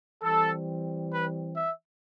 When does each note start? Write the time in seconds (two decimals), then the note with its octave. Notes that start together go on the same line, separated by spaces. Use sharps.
0.22 E3 G3 C4 A4
1.12 B4
1.57 E5